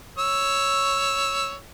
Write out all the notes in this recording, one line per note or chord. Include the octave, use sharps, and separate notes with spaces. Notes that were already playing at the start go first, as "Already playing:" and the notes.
C#5 E6